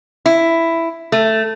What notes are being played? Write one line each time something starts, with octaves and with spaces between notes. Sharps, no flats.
E4
A3